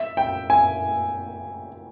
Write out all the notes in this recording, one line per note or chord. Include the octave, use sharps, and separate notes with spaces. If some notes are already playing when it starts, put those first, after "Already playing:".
Already playing: E5
G5
G#5